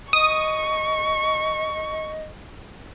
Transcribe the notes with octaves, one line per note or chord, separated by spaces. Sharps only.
D#5 C#6 D#6